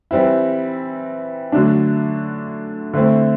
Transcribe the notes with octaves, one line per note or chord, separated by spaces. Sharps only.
E3 G3 C4 E4
D3 F#3 A3 D4
D3 A3 C4 E4